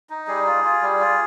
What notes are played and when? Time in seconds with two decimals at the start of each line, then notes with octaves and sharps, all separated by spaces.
0.10 D#4
0.27 G3 G#4
0.46 F4
0.64 F4
0.82 G3
0.99 F4